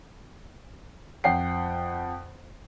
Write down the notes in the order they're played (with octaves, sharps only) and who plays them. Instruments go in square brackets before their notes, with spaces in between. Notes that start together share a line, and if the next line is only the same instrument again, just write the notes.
[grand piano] F2 F#5 G5 C7